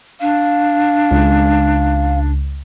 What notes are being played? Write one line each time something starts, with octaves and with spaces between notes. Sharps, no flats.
D4 F5
C#2